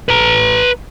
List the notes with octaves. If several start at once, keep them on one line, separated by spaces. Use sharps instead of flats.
B4 A#5